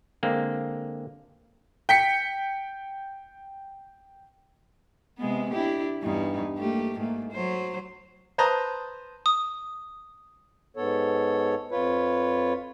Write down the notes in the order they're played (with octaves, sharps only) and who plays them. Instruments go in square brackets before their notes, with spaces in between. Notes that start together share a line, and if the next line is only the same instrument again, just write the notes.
[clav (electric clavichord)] D3 G#3 A#3 C4
[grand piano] G5 B6 C#7
[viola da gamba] C3 G#3 B3
D4 E4 G4
E2 G2 D#4
A3 A#3 G4
G#2 A3 A#3
F#3 C5
[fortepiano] B4 C5 A5 A#5 D#6
[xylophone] D#6
[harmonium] G#2 B3 A4 C#5
F2 F4 B4 C#5